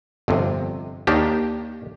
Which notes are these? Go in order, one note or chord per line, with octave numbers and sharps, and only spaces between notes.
G1 F2 C3
D#2 D#3 A#3 D4 G4